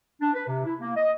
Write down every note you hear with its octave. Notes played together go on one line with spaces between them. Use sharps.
D4
B4
C3
E4
A#3
D#5